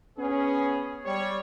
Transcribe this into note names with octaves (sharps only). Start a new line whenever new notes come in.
B3 C#4 G#4
G3 C#5